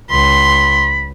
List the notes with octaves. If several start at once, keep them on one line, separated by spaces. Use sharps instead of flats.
C#2 B5 C6